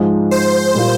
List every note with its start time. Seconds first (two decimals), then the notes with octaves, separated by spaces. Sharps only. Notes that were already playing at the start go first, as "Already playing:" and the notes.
Already playing: G#2 F3 G#3 D#4
0.31 C5
0.74 A#2 G3 A#3 F4